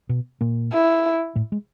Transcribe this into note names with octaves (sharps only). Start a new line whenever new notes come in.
B2 B3
A#2 A#3
E4
A2 A3
G#3